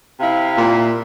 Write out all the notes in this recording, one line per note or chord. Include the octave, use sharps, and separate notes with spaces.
C3 E4 F5
A#2